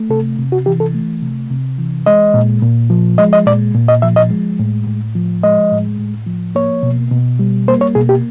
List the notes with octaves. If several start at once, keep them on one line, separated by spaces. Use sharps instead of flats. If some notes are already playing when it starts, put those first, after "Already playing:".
Already playing: A3
C3 A4
C3
F#4
E3 G4
A4
A3
C3
C3
E3
G#3 D#5
A#2
A#2
F3
G#3 D#5
D#5
A#2 D5
A#2
D#5
F3 E5
D#5
G#3
A2
A2
F3
G#3 D#5
A2
A2
F3
A#3 C#5
B2
B2
G3
A#3 C5
C#5
B2 G#4
G4